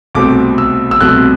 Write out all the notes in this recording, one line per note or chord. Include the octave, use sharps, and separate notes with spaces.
C2 B2 A3 C4 D6
E6
E6
C2 B2 A3 C4 F#6